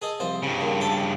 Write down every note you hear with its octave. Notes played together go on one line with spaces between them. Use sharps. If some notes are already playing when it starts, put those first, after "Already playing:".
G#4 A4 D#5
C2 F3 C5
G2 C#3
A#2
A4 G5 A5